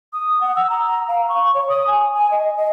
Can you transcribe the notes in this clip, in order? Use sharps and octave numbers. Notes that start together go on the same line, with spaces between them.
D#6
F#5
E6
A#5
F5
C#6
C#5
D#6
G#5
G#5
D#5
D#5